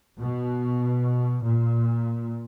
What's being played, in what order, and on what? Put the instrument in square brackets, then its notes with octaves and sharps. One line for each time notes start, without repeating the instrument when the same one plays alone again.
[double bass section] B2
A#2